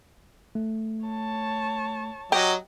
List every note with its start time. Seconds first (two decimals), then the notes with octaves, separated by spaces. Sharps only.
0.55 A3
1.05 C#5 A5
2.32 F#3 G4 D#5